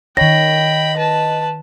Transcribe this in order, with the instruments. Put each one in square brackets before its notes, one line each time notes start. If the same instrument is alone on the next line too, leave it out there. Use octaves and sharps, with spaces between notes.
[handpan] D#3 C#5 [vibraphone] D#5 [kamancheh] G5 B5 [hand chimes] A#6
[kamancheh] B4 A5